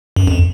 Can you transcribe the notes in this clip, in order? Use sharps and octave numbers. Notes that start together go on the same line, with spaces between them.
F#2
F2